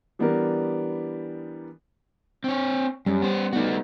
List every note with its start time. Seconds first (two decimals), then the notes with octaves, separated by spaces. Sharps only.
0.19 E3 G3 B3 D4 G4 A#4
2.44 C4 C#5
3.06 F#2 G3 C#4
3.22 B3 C5
3.53 A3 B3 D#4 F#4